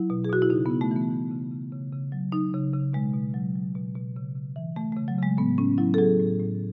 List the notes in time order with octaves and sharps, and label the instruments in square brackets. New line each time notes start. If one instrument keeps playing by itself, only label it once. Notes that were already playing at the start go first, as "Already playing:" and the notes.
Already playing: [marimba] F#3 E4
B2
G#4
B2 F#4
E4
C#3 D#4
C#3 B3
A3
E3
B3
E3
C#3
C#3
C#3
C#3
F#3
F#3 D#4
C#3
C#3
B2 G#3
B2
F#3
F#3
B2
B2
C#3
C#3
E3
E3 A3
C#3 A3
F#3
C#3 G#3
A2 B3
A2 C#4
F#3 E4
A4
F#3 G#4
A2
A2